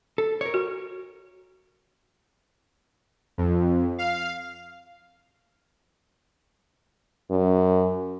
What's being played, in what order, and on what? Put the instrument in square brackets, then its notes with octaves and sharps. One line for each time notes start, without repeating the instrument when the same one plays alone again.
[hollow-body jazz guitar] A4
A#4 C#5
[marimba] F#4
[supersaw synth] F2
F5
[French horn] F#2